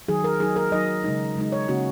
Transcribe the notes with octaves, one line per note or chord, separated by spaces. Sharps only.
D#3 F#3 D#4 G#4
A#4
F#3 D#4 G#4
A#4
F#3 D#4 D#5
C#3 G#3 D#4
C#3 G#3 D#4
C#5
C#3 A#3 C#4 F#4